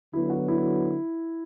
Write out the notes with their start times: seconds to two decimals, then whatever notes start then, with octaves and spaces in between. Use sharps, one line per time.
0.13 D3 F#3 B3 E4
0.30 F#4
0.48 E4